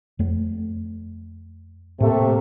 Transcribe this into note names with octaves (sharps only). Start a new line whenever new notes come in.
F2 A3
A2 C3 A3 A#3